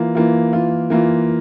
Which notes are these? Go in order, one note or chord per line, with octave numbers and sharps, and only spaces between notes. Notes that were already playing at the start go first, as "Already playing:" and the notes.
Already playing: E3 A#3 F4
E3 A#3 F4
E3 A#3 F4
E3 A#3 F4